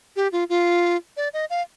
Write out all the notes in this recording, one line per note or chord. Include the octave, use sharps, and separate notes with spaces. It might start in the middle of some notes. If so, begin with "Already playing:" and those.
G4
F4
F4
D5
D#5
F5